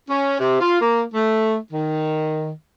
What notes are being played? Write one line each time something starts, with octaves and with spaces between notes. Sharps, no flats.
C#4
C3
F4
A#3
A3
D#3